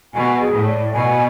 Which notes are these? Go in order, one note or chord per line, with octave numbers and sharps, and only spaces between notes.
B2 G#5
G#4
A2
D5
B2 G#5